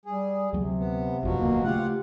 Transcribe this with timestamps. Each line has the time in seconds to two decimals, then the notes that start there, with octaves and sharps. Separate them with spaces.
0.05 G3 G#4
0.53 D2 C3 F#3 G#3
0.79 B3
1.23 G#1 F2 G#2 B2 F3 F#3
1.38 D#1 C#2 D3 A#3
1.64 C#3 A3 F4 G4 F#5